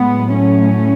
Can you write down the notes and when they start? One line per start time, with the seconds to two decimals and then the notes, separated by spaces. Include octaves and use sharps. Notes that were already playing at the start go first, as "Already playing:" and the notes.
Already playing: A2 F#3 G#3 B3
0.32 A3 C#4